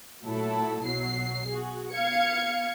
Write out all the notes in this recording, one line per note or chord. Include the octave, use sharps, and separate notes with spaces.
A#2 F#3 A3 E4 A4
B1 B2 F#3 C7
F#4 G#4
B3 F5 G#6 C#7